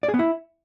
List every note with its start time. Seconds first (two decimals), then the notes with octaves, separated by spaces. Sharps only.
0.03 D5
0.08 G#4
0.14 B3
0.19 E4